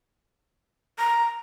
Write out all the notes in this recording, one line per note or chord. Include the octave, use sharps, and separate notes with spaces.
A#5